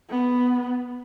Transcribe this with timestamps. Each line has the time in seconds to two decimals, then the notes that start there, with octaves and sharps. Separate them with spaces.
0.10 B3